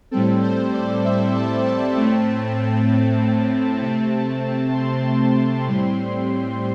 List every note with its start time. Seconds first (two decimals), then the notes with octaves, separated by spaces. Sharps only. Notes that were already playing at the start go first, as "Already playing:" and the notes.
0.11 A2 G3 C4 A4
0.43 C5
0.73 D5
1.05 E5
1.35 A5
1.66 A5
1.97 A2 A3 C4
2.89 A5
3.81 C3 A3 C4
4.73 C6
5.66 A2 G3 C4